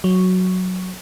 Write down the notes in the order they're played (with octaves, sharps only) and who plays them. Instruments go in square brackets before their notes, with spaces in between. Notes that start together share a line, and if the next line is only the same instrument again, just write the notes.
[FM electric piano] F#3